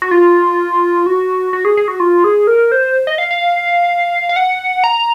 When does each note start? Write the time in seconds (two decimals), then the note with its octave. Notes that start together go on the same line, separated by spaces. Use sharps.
0.02 F#4
0.11 F4
1.06 F#4
1.53 F#4
1.65 G#4
1.77 G#4
1.88 F#4
2.00 F4
2.24 G#4
2.47 A#4
2.72 C5
3.07 D#5
3.18 F5
3.31 F5
4.29 F5
4.36 F#5
4.84 A#5